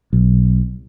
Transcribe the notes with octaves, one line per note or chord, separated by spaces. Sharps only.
B1